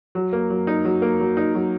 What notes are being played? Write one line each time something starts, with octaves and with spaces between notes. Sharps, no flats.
F#3
A#3
F#3
D#4
F#3
A#3
F#3
D#4
F#3